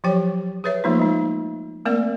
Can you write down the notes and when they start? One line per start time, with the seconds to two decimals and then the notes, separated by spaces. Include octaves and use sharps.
0.04 F3 F#3 G4 C#5 G5
0.64 G#4 B4 C#5 E5
0.84 F3 A3 A#3 D#4 F4
0.99 G#3 D#4
1.85 A3 A#3 C4 A#4 D5